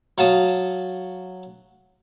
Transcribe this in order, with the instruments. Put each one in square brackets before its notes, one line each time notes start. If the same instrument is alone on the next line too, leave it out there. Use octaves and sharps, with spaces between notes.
[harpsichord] F#3 F5 A5 D#6